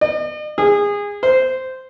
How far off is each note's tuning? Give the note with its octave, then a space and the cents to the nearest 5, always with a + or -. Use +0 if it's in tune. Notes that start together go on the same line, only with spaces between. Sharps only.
D#5 -45
G#4 -25
C5 -10